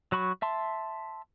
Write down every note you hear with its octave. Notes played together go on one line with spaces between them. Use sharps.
F#3 F#4 B5 C#6
E5 A5 C6